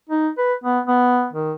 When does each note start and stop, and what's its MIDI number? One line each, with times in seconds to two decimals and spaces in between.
0.10 0.29 63
0.38 0.54 71
0.64 0.80 59
0.88 1.27 59
1.33 1.53 51